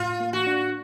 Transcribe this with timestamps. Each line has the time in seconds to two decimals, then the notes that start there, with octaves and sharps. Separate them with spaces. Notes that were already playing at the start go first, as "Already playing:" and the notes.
Already playing: A2 F4
0.20 A#3
0.33 F#4
0.47 D4